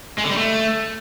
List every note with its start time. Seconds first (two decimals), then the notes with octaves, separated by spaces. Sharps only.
0.18 G#3
0.24 D3
0.31 G3
0.37 A3